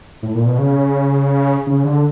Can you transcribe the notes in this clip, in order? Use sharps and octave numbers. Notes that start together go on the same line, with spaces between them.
A2
A#2
B2
C#3
C#3
D3